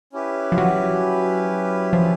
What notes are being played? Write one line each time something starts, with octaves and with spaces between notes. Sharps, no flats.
C#4 E4 G4 B4
F3
F#3
F3